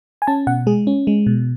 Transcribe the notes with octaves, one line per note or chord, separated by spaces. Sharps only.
G#5
C#4 A5
B2 F#5
G#3 G#4
C#4
G#3
B2